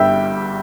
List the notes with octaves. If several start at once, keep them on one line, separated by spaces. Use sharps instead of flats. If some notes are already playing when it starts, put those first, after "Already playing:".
Already playing: G1 G2 G3 E5 G5